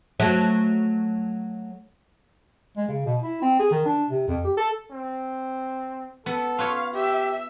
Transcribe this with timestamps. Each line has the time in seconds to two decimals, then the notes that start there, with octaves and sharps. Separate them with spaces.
0.20 F#3 A3
2.77 G#3
2.89 C#3
3.06 B2
3.22 E4
3.42 C4
3.60 G#4
3.71 D#3
3.86 D4
4.09 C3
4.28 F2
4.45 G4
4.57 A4
4.91 C4
6.26 B3 A4
6.59 F4 B4 C#5 F5
6.95 G4 E5